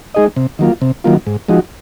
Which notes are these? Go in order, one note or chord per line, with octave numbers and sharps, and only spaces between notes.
G#3 D#4 G#4 D#5
C3
D#3 F#3 A#3 F4
C3
D#3 F#3 A#3 F4
G#2
F3 G#3 D#4 F#4